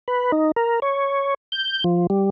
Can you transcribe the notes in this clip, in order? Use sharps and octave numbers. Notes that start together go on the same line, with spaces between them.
B4
D#4
A#4
C#5
G6
F3
G3